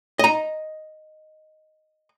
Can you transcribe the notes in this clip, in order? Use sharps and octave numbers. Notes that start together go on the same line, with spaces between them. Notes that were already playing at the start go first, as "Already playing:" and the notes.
D#5 A#5